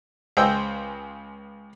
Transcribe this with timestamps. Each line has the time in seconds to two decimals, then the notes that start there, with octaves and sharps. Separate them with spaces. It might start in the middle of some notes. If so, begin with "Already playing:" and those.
0.37 C#2 G#4 C5 D#5 G5 E6